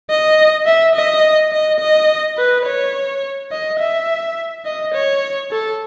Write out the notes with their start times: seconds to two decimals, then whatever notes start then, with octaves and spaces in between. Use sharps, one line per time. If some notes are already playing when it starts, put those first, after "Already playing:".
0.10 D#5
0.67 E5
0.95 D#5
1.52 D#5
1.80 D#5
2.38 B4
2.66 C#5
3.52 D#5
3.79 E5
4.65 D#5
4.94 C#5
5.51 A4